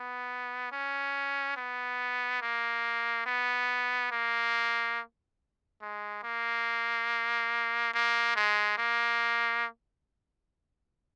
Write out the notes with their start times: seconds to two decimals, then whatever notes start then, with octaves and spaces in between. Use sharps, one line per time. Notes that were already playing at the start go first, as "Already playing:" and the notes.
Already playing: B3
0.72 C#4
1.57 B3
2.42 A#3
3.26 B3
4.12 A#3
5.82 G#3
6.23 A#3
7.94 A#3
8.36 G#3
8.78 A#3